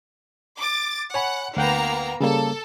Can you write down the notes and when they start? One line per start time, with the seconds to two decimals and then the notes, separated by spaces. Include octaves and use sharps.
0.58 D6 A6
1.14 C#5 F#5 G#5 B5
1.57 D2 A#3 B3 F#5 G5 A#5
2.21 C#3 G3 A#3 A4